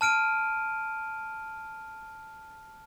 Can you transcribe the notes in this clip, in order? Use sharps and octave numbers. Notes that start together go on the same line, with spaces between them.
A5 F6 D7 D#7